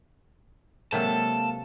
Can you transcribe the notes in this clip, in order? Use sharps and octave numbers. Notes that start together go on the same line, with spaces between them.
C3 F#3 G#3 A#3 A4 F5 A5